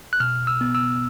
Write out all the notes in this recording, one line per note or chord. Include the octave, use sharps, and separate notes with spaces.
F#6
B2 F6
E6
B3
E6